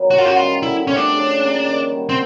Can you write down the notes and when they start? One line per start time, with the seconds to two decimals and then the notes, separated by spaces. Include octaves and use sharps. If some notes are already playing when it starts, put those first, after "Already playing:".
Already playing: D#3 F#3 B3
0.10 F#2 F#4
0.18 F4
0.25 F#4
0.36 D#3 G3 B3 F4
0.62 D3 E4
0.87 F3 A3 C4 C#4
0.96 D4
1.13 C#3
1.39 F3 A#3 C#4
1.65 D#3
1.91 G3 B3
2.09 C4